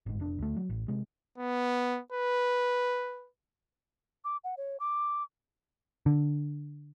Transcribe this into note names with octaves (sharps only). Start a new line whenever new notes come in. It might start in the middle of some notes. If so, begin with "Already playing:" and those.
G1 G#2
F1 D4
D2 A3
F#3
A1
C3 G#3
B3
B4
D6
F#5
C#5
D6
D3